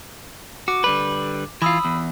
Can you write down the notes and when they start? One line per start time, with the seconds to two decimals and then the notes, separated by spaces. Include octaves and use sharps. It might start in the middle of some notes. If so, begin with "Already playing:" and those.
0.68 F#4 D6
0.84 D3 G3 B4
1.62 E3 F4 B5 D#6 E6
1.85 E2